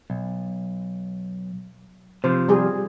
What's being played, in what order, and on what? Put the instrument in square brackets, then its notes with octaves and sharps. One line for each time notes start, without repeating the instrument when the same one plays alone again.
[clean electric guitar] B1
[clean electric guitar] C3 F3 [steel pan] C5
[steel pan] G3 G#4